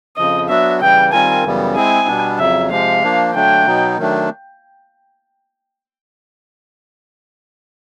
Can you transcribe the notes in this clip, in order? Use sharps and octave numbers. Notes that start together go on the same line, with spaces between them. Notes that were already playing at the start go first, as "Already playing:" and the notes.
F2 C#3 F3 D#5
F#3 B3 D4 F#4 E5
C#3 E3 G3 G5
D#3 G3 C4 F4 A#4 G#5
F#2 C#3 E3 G3 B3
G#3 C4 E4 G#4 G#5
B2 G3 B3 D4
F2 C#3 F#3 E5
C3 F3 G#3 F5
F3 A#3 D4
D3 F#3 A3 D4 G5
B2 F#3 B3 D#4
D#3 F#3 A3 D4